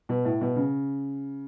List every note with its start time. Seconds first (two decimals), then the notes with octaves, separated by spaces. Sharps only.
0.09 B2
0.25 A2
0.41 B2
0.56 C#3